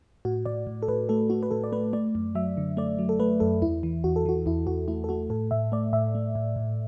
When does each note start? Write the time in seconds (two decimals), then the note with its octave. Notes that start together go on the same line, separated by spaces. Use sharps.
0.25 A2 F#4
0.46 A2 D5
0.67 A2
0.83 A4
0.88 A2 B4
1.09 A3 A4
1.30 A3 F#4
1.43 B4
1.51 A2 A4
1.64 D5
1.72 A3 B4
1.93 A3 D5
2.15 F#2
2.35 F#3 E5
2.57 D3
2.77 A3 D5
2.99 F#3
3.09 A4
3.19 A3 B4
3.40 F#2 A4
3.62 E2 E4
3.83 E3
4.04 E2 F#4
4.16 A4
4.26 E3 F#4
4.46 E2 E4
4.67 E2 F#4
4.88 A3 E4
5.04 A4
5.09 A3 F#4
5.30 A2 A4
5.51 A2 E5
5.72 A3 D5
5.93 A2 E5
6.15 A3
6.35 A2
6.56 A2